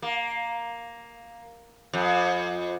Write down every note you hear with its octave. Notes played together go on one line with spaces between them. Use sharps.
A#3
F2